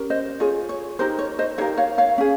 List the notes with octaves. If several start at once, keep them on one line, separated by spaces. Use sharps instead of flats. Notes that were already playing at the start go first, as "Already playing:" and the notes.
Already playing: C#4 G4 A#4
C5 D#5
F4 G#4 C#5
C#5
D#4 G4 A#4 C5
C#5
C5 D#5
D#4 G4 A#4 C#5 F5
C#5 F5
C#5 F5
C#4 G#4